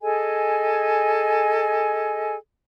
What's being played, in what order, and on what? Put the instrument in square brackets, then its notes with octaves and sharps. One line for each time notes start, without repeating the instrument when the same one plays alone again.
[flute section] G#4 A4 D#5 G#5